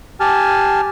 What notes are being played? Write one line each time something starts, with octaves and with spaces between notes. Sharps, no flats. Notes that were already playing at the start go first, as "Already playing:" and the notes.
G4 G#5 A5 F6